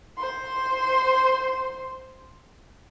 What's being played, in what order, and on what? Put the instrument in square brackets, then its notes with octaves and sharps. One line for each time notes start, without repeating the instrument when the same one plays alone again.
[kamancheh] C5 C6